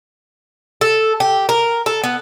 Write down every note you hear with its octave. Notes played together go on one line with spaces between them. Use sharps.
A4
G4
A#4
A4
B3